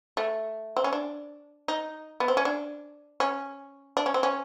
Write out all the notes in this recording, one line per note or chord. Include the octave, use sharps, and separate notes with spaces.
A3
C4
C#4
D4
D#4
B3
C4
C#4
D4
C#4
D4
C#4
C4
C#4